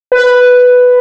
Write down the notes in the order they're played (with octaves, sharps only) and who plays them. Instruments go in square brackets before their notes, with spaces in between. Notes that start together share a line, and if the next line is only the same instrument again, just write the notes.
[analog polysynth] B4